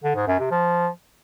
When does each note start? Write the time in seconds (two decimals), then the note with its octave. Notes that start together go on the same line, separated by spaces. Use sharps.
0.04 D3
0.16 G#2
0.27 F#2
0.39 C3
0.51 F3